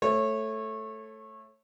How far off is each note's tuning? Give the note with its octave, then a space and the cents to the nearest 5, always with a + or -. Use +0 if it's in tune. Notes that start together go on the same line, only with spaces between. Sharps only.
A3 +0 C#5 -25